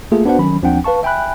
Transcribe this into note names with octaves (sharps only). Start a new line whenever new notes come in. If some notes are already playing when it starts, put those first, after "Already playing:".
A3 A#3 F4 G#4
B3 D4 F#4 B4 C5 F#5
D#3 F#3 C#4 B5
D#2 F3 C4 D4 F#5 G5
B4 F5 A5 C#6
E5 G5 G#5 B5 F#6